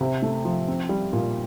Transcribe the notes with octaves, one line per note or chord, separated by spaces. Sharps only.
C3
A3
F3
C4
G3
A#2